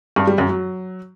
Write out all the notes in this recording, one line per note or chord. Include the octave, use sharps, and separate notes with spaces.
G2
G3
F#2
F#3